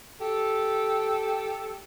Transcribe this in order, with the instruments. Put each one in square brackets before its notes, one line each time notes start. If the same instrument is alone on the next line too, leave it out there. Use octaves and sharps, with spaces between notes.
[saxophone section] G4 A4